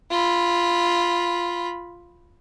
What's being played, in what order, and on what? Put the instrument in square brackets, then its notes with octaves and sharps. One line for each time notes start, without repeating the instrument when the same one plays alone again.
[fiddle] F4 B5